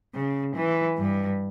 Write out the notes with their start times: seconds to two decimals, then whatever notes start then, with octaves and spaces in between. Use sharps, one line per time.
0.14 C#3
0.55 E3
0.98 G2